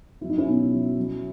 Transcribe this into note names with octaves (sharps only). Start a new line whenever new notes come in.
F#3 E4
D#4
C#4 E4
B2
F#3
F#3